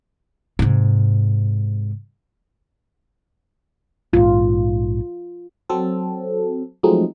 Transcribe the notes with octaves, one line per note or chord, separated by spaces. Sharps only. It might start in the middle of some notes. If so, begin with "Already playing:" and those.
G#2 C3
A#1 G#2 F4
F#3 C4 A4
F3 F#3 G#3 A3 C4 D#4